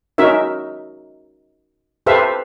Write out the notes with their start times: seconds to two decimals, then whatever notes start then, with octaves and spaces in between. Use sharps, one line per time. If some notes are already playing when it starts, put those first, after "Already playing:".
0.18 C#4 D#4 F#4 A#4 E5
2.06 G4 A4 B4 C5 E5 F5